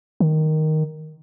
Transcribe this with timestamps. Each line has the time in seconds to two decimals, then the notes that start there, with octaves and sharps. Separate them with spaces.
0.20 D#3